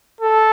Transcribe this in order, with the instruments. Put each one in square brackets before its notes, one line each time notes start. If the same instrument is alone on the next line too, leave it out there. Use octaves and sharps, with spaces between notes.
[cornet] A4